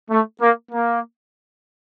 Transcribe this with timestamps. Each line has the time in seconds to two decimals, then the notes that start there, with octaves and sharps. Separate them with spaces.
0.11 A3
0.41 A#3
0.72 A#3